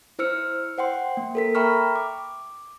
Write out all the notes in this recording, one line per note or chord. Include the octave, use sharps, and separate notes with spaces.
E4 C5 E6 F6 C#7
C5 F#5 G5 C6
A#3
A4 A#4 B6
E5 G5 A#5 B5 C#6 F6
D6